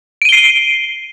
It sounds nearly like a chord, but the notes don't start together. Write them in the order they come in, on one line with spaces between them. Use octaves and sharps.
D7 D#7 G7 C7